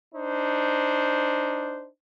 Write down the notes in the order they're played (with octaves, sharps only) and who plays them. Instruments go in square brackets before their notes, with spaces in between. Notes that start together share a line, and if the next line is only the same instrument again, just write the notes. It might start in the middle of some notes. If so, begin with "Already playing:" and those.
[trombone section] D4 D#4 C5